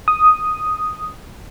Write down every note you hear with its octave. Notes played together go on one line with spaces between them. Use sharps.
D#6